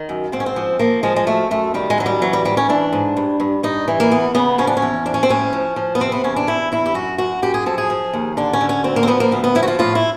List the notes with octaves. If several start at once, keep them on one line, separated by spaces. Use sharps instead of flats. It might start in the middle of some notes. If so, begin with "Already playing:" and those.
Already playing: D#3
F#2
G#2 C4
C#4
C4
F3
F3 A#3
F3 G#3
G#3
F#2 A3
F#2 A3
D#3 G3
G#3
F#2 F#3
G3
E3 F#3
G3
G#2 G3
C#4
E3 D4
G#2
G2
G2
G2 D#4
E3
A#3
E2 B3
C#3 B3
F3 C#4
D4
C#4
E2
F3 D4
C#4
C4
A2 C#4
F3
F3
B3
C3 C4
B3
E2 C#4
D4
E2 E4
E2 E4
G4
F#2 F#4
F#2 F#4
F#2 G4
G#4
F3 A4
G#4
F3
D#2
D3 D4
C#4
D3
C#4
D2 C4
A#3
C4
F3 B3
A#3
D2 B3
B3
F3 E4
F#4
F4
A2 F4
E4